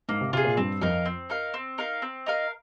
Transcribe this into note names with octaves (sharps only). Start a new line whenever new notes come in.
G#2 A#3
C3
C3 F4 G#4
A#2
G2 C4
F2 D#4 A#4 F5
C4
D#4 A#4 F5
C4
D#4 A#4 F5
C4
D#4 A#4 F5